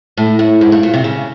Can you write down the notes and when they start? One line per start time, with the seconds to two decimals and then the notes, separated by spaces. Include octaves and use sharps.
0.17 A2
0.39 A2
0.61 G#2
0.72 G2
0.83 A#2
0.94 C3
1.04 C#3